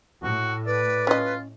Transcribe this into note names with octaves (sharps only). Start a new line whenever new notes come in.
A2 F#4
B4 D5
C#4 F4 D#5